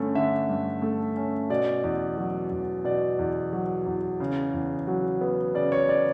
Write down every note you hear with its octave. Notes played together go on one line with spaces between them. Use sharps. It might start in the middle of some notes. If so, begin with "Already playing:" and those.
Already playing: G2 D3 A3 C#4
D3 E5
G2
A3
C#4
B2 D5
E2
F#3
E2
B2 D5
E2
F#3
E2
C#3
E2
F#3
B3
C#3 D5
C#5
D5